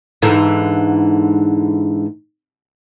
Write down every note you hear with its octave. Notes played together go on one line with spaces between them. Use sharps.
G#2 D3 E3